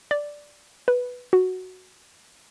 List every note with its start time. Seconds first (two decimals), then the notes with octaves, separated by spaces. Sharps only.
0.11 D5
0.88 B4
1.33 F#4